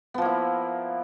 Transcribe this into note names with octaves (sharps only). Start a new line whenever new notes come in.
F3 A#3 B3 E4